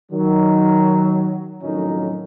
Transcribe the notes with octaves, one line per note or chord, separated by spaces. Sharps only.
D#3 F#3
F2 A2 D#3 F#3 C#4 D#4